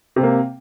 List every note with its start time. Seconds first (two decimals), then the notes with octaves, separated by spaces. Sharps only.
0.16 C3
0.20 C4
0.23 A#3